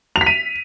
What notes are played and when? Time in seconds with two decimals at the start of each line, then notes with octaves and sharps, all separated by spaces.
0.16 F7
0.21 B6
0.26 D#7